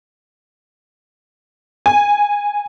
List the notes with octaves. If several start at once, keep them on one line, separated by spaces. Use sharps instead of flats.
G#5